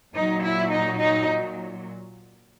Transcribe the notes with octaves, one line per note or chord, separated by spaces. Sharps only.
A#2 F#3 D#4
E4
D#4
D#4